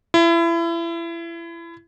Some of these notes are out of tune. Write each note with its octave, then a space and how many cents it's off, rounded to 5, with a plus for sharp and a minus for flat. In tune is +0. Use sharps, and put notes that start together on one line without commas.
E4 +30